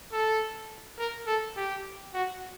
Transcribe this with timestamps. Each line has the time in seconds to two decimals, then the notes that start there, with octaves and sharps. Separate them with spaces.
0.13 A4
0.99 A#4
1.27 A4
1.57 G4
2.14 F#4